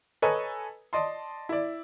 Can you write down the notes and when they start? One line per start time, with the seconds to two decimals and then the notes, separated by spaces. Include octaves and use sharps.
0.22 A4 B4 C#5 D#5 G#5 A#5
0.93 D5 D#5 A5 C6
1.49 E4 D5